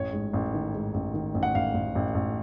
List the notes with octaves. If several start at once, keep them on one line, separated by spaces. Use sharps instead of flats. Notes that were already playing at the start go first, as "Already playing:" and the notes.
Already playing: A1 C#5
G#2
A1
D#3
G#2
A1
D#3
A1
F#5
A1 F5
A1
A1
A1